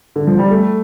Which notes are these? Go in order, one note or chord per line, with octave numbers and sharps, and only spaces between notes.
D3
F3
G3
A3